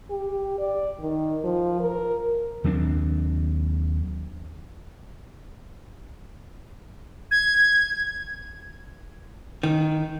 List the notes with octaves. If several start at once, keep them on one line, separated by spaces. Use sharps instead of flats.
G4
D5
D#3
F3
A#4
D#2 F#3 C4 D4
G#6
D#3